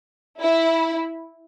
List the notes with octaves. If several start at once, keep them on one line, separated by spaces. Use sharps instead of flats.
E4